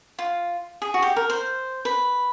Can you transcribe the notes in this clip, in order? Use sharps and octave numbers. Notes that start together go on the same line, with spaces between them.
F4
G#4
F#4
G4
A#4
C5
B4